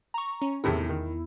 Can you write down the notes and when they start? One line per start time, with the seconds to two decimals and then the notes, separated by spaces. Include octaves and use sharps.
0.14 A#5 C#6
0.42 C#4
0.64 E2 A2 C3 D#3 E4 G#4
0.89 D#3